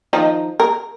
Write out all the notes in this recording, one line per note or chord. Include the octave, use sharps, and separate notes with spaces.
D#3 F3 D#4
A#4